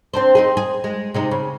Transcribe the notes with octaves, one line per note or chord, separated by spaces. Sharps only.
C4 D4 C5
C4 D#4 G#4
G#4
G#3
C3 G#3 D#4
C#3